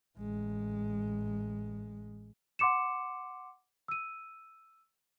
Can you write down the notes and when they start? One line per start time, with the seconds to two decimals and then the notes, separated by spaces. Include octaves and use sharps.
0.17 A1 G#3
2.59 F#5 C6 D6 C#7 E7
3.88 E6 D#7